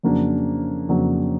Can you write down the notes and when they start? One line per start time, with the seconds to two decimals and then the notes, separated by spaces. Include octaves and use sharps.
0.03 F2 C#3 F#3 A#3 D4
0.89 F2 C#3 F#3 A#3 D4